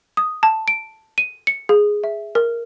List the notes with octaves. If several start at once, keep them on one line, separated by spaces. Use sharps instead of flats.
D#6
A5
D7
D#7
C#7
G#4
E5
A#4